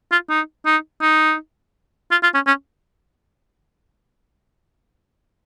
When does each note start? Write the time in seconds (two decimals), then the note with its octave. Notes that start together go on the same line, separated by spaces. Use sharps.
0.11 F4
0.30 D#4
0.66 D#4
1.01 D#4
2.11 F4
2.23 F4
2.34 C#4
2.47 C#4